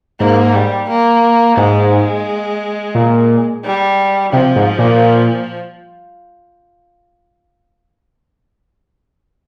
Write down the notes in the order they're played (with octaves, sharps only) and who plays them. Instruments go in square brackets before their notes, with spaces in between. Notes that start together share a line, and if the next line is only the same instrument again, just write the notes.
[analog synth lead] G#2 [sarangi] A#3
[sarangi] G3
A#3
[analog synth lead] G#2 [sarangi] G#3
[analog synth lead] A#2
[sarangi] G3
[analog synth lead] C3 [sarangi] F3
[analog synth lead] G#2
A#2